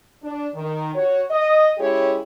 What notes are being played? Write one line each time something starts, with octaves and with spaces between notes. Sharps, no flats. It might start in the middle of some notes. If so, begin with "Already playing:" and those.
D4
D#3
F#4 C#5
D#5
G#3 C#4 E4 G4 G#4 C#5